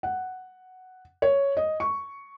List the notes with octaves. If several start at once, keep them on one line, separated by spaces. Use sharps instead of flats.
F#5
C#5
D#5
C#6